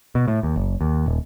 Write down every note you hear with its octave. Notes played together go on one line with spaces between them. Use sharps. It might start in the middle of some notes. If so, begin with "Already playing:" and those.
B2
A2
D#2
F#1
D#2
D#1